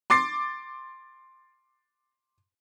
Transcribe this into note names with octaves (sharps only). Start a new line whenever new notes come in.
C6 D6 A6 C7